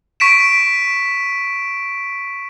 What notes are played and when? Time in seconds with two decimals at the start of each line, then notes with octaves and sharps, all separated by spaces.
0.20 C#6 B6 D7 E7